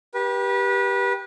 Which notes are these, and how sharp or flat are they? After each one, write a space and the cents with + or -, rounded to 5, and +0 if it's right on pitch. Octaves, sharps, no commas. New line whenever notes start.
G4 +0 B4 -30